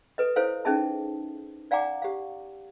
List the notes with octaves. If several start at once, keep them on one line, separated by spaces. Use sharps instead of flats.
A4 B4 D#5
E4 A4 C5 C#5 F5
C#4 D#4 G#4 D#5 E5 A5
D5 F5 F#5 G#5 A#5 D6
G4 F5